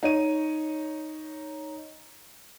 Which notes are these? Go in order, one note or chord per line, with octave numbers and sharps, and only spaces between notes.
D#4 C#5 D#7